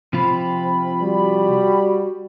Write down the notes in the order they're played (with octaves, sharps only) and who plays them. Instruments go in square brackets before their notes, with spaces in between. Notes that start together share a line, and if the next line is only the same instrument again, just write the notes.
[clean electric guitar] C3 F3 F4 [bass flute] C4 [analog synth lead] B5
[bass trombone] G3 [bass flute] F#4